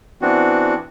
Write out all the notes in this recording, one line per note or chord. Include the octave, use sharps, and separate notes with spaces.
E3 B3 C4 D4 F#4